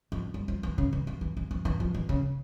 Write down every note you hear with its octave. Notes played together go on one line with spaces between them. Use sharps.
F2
G2
F3
E3
C#3
E3
F3
E3
E3
F3
E3
F3
E3
C#3